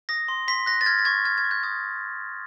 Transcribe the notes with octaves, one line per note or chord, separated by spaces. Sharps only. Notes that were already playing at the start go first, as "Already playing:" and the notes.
D#6 A#6
C6
C6 B6
F#6 A#6
A6
F6 G#6
A6
C#6 G#6
F6 G#6
G#6
C#6
G6
D#6 G#6